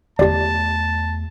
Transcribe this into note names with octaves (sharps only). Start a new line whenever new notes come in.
E2 A3 G4 D5 A5